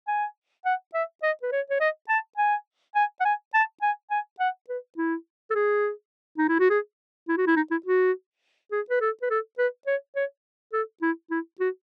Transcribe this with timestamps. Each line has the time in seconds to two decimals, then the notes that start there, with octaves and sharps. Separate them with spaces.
0.08 G#5
0.65 F#5
0.94 E5
1.23 D#5
1.43 B4
1.52 C#5
1.70 C#5
1.80 D#5
2.09 A5
2.37 G#5
2.95 G#5
3.20 F#5
3.25 G#5
3.54 A5
3.82 G#5
4.11 G#5
4.40 F#5
4.69 B4
4.97 E4
5.50 A4
5.55 G#4
6.38 D#4
6.49 E4
6.60 F#4
6.70 G#4
7.28 E4
7.37 F#4
7.47 E4
7.56 D#4
7.71 E4
7.86 F#4
8.72 G#4
8.90 B4
9.01 A4
9.22 B4
9.30 A4
9.58 B4
9.87 C#5
10.16 C#5
10.73 A4
11.02 E4
11.31 E4
11.60 F#4